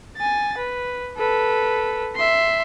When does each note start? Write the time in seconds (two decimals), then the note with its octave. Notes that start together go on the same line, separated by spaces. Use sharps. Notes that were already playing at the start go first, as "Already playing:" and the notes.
0.17 G#5 A6
0.58 B4
1.17 A4 B4
2.16 E5 C6